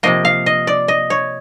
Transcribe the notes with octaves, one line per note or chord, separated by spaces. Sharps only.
C3 F3 A#3 D#5
F5
D#5
D5
D#5
C#5